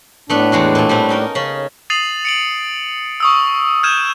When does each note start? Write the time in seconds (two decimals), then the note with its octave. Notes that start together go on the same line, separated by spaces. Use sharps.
0.30 A2 A3 B3 D4 B4
0.52 E2 G#3 F#4
0.75 A#2 A3
0.89 G3 B3 C4
1.09 C#4 D#4 A#4
1.35 C#3 C#4
1.90 D#6 A6 C7 D#7 F7 F#7
2.25 C#7 D7 F#7
3.20 C#6 D#6 E6
3.83 F6 G6 G#6 D#7 E7